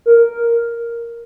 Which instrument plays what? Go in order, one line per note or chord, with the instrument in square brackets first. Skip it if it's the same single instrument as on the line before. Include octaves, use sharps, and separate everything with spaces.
[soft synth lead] A#4